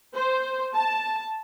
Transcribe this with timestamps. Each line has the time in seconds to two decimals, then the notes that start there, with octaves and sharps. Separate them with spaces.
0.14 C5
0.74 A5